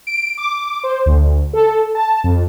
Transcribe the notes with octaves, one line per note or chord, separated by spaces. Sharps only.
D7
D6
C5
D2
A4
A5
F2